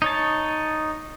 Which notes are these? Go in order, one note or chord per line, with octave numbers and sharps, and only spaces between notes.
D#4 C#5 A5